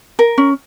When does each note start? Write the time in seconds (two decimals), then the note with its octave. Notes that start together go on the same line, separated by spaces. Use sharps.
0.19 A#4
0.38 C#4